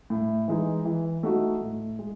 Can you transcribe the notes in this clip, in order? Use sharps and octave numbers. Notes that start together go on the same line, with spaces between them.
A2
E3 G#3 D#4
E3
A3 D#4 F#4
A2
G#3